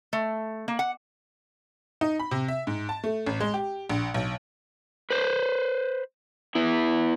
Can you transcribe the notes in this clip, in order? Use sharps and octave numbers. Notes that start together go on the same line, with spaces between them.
A3
A#3
F#5
D#4
B5
C3
E5
G#2
A5
A3
A1
G#3
G4
A#1
B1
B4 C5
B3 E4